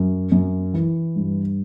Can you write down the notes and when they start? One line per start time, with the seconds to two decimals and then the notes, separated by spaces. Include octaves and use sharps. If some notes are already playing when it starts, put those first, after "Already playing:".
Already playing: F#2
0.32 F#2
0.74 E3
1.16 G2